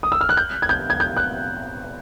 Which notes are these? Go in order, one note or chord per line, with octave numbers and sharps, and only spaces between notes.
D#6
E6
F6
F#6
G6
G#6
G6
G#6
G6
F#6